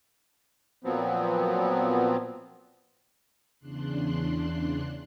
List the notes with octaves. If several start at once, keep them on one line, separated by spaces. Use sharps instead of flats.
A#2 F3 F#3 B3 C4
E2 C#3 D4 C6 F#6